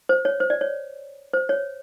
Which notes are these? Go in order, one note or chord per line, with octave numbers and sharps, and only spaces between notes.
C5
C#5
C5
D5
C#5
C5
C#5